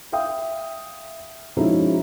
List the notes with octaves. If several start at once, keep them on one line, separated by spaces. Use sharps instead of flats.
E5 F5 G5 D#6
F3 G#3 C#4 D#4 E4 F#4